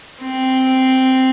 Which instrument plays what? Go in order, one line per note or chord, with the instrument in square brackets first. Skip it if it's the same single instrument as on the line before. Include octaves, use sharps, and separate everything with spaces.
[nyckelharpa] C4